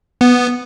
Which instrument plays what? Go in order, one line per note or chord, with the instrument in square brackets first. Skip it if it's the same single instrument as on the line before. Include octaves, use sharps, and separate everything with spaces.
[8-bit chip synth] B3